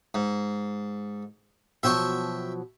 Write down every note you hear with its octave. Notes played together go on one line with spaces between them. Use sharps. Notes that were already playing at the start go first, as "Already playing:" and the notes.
G#2
B2 F3 F#3 E5 G5 C#6